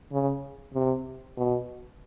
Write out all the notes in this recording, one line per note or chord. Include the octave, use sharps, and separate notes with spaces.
C#3
C3
B2